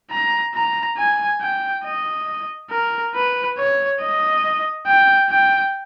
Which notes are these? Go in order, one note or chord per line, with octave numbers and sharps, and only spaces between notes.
A#5
A#5
G#5
G5
D#5
A#4
B4
C#5
D#5
G5
G5